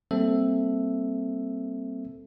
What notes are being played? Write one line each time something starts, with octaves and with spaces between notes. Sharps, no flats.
G3 A#3 C4 A4 E5